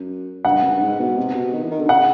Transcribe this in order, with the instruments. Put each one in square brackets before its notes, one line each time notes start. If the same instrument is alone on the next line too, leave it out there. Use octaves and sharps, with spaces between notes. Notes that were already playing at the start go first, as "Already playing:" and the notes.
Already playing: [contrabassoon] F#2
[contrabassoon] G2 [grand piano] F#5
[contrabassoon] F#2
G2
G#2
B2
C3
B2
D#3
E3
D#3
D3
[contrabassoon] C#3 [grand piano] F#5